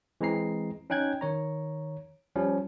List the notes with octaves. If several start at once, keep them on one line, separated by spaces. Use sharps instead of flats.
E3 G#3 C4 A#5 C7
C#4 D#4 G5 F#6 G#6
D#3 C#5 A#5
F3 G3 C#4